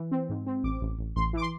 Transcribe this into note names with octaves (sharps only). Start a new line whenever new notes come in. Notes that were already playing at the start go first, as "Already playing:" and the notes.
Already playing: E3
C4
G#2
C4
A1 D6
A1
A1
A1 C6
E3 D6
C6